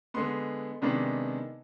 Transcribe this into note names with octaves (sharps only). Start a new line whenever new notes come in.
D3 G#3 B3 C6
C3 D#3 G#3 B3 D4